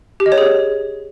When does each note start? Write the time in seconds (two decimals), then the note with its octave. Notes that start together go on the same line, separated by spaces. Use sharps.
0.20 G4
0.26 D#5
0.32 C#5
0.38 G#4